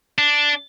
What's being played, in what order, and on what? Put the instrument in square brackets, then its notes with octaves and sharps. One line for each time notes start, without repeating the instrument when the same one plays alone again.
[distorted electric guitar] D4